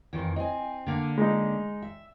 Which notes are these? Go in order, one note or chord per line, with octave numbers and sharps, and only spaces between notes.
F2 D#3 E3
C4 D#5 G#5
D3 A#3
G#3 D#4
E5